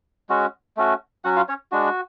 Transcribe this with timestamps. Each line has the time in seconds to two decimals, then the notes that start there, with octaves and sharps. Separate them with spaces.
0.29 G#3 C#4 F#4
0.77 A3 C#4 F#4
1.24 F#3 C#4 F#4 F#5
1.36 F4 F5
1.48 C#4 C#5
1.72 G#3 D4 F#4